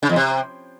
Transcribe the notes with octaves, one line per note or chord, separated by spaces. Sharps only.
C#3
E2
C3